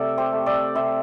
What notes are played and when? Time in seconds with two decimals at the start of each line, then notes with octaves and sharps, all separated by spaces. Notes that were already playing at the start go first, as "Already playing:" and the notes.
Already playing: C3 A3 A4 D5 E5
0.18 G4 C5
0.32 A3
0.46 A4 D5
0.75 C3 C5 E5